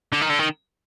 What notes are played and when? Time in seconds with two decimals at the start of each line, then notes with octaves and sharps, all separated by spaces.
0.12 D3
0.21 D#3
0.29 D3
0.39 D#3